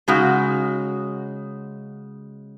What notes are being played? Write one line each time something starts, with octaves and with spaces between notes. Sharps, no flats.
C#3 G#3 D#4 F#4